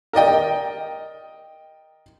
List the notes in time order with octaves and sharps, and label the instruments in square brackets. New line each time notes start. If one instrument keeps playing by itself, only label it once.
[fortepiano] A#4 D5 D#5 G5